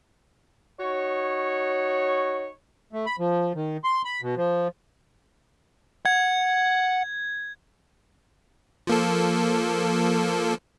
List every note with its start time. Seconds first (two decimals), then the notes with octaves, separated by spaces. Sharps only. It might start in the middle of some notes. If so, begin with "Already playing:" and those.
0.79 D#4 F#4 C#5
2.93 A3
3.06 B5
3.19 F3
3.55 D#3
3.84 C6
4.05 B5
4.22 B2
4.37 F3
6.05 F#5 G#6
8.87 F3 A#3 A4